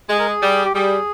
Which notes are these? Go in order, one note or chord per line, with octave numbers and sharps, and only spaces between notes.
G#3 G#4
A#4
G#4
G3
G4
G3 G#4